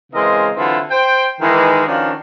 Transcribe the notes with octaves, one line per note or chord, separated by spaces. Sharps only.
C#3 E3 G#3 C4 A#4 D#5
D3 E3 F#3 C4 E4 F4
C5 G5
D#3 E3 G#3
D#3 F3 C#4 D4 F4 F#4